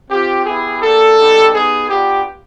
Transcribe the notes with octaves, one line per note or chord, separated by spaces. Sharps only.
C4 F4 G4
B3 E4 G4 G#4
A#3 D4 G4 A4
G3 B3 D#4 G4
B3 D#4 G4 G#4
B3 D4 F4 G4